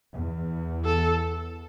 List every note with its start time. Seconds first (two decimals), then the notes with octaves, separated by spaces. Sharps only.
0.13 E2
0.85 A4